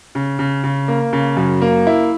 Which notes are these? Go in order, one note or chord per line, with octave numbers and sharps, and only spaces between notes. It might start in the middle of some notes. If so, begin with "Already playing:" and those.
C#3
C#3
C#3
A#3
C#3
F#2
A#3
E4